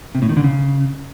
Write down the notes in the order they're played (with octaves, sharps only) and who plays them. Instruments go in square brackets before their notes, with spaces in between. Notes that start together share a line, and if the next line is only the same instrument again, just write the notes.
[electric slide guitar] C3
A2
D#3
D3
C#3